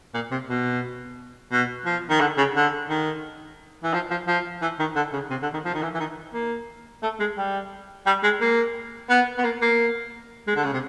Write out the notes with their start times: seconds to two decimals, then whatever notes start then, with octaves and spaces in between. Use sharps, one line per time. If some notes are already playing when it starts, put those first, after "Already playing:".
0.15 A#2
0.32 C3
0.49 B2
1.53 B2
1.86 F3
2.10 D#3
2.21 D3
2.38 C#3
2.56 D3
2.89 D#3
3.84 E3
3.94 F3
4.11 F3
4.28 F3
4.62 E3
4.80 D#3
4.96 D3
5.13 C#3
5.31 C3
5.42 D3
5.54 D#3
5.65 F3
5.75 D#3
5.83 E3
5.95 E3
6.00 D#3
6.34 A#3
7.03 A3
7.20 G#3
7.38 G3
8.06 G3
8.23 G#3
8.41 A#3
9.10 B3
9.38 B3
9.44 A#3
9.62 A#3
10.48 G#3
10.56 D3
10.64 C#3
10.73 C3